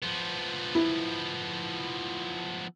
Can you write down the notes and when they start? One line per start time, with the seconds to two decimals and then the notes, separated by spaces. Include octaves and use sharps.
0.03 F3 B3
0.75 E4